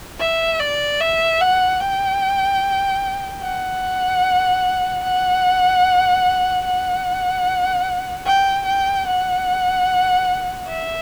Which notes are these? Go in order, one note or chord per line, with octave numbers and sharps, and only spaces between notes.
E5
D5
E5
F#5
G5
F#5
F#5
F#5
G5
G5
F#5
E5